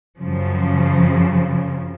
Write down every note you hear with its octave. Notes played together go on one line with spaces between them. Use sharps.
F#2 C#3 F3